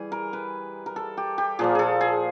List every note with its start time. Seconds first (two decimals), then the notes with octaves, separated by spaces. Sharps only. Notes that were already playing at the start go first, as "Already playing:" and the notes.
Already playing: E3 G3 G#4
0.12 A#4
0.33 B4
0.86 A#4
0.96 A4
1.17 G4
1.38 G4
1.59 A#2 F3 A#3 G#4
1.75 G#4 A4
2.01 G#4